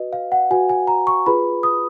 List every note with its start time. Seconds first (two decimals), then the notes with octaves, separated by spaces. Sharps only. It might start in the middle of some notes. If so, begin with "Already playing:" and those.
Already playing: F#4 B4 D#5
0.13 F5
0.32 F#5
0.51 F#4 B4 G#5
0.69 G#5
0.87 A#5
1.07 C#6
1.26 F4 G#4 B4 B5
1.63 D#6